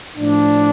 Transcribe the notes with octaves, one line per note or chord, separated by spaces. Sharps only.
A2 F3 D4